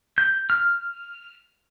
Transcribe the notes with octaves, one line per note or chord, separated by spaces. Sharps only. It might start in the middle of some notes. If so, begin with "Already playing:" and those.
G6
F6